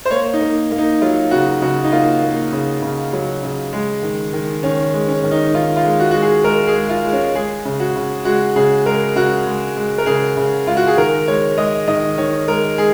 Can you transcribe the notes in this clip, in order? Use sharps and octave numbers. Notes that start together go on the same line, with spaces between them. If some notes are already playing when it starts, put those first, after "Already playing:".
C5
A#3 C#5
D#4
A#3
A#3
D#4
F#3 F4
C#3 F#4
C#3 F#4
D#4
A#3 F4
A#3
C#3
C#3
F#3
C#3
G#3
D#3
D#3
D#3 C#4
G#3
C#4
D#3
D#4
D#3 F4
F4
G#3
F#4
G#3 F#4
G#4
G#3 A#4
G#4
G#3
F4
G#3
C#4
G#3 G#4
C#3
F#4
C#3
G#3 F#4
C#3 G#4
G#3 A#4
C#3 F#4
G#3
G#3
A#4
C#3 G#4
C#3
G#3 F4
F#4
G#4
D#3 A#4
G#3 C#5
G#3 D#5
D#3 D#5
D#3 C#5
G#3 A#4
G#3 G#4